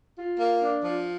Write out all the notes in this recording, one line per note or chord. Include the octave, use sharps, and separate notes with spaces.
F4
A#3
D4
F3